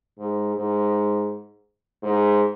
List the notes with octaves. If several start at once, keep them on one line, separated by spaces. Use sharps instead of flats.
G#2
G#2
G#2